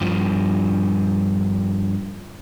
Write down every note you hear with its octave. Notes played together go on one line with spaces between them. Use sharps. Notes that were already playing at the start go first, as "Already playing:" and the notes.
G2 F3